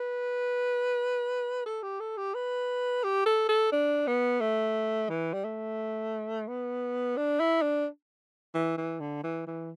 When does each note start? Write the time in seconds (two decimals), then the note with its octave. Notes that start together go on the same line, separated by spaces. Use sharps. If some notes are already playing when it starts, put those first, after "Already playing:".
Already playing: B4
1.66 A4
1.83 G4
2.00 A4
2.17 G4
2.34 B4
3.04 G4
3.26 A4
3.49 A4
3.72 D4
4.07 B3
4.41 A3
5.09 E3
5.33 G3
5.44 A3
6.48 B3
7.17 D4
7.40 E4
7.62 D4
8.54 E3
8.77 E3
9.00 D3
9.23 E3
9.47 E3